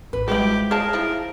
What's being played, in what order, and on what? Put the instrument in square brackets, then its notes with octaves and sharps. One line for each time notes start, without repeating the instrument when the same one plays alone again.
[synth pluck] A1 [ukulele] B4
[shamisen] F3 E4 [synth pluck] G3 G#3 F#4 [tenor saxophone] G4
[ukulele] G#4 [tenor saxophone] A#4 [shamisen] C#5 A5 [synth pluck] F5
[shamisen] F3 E4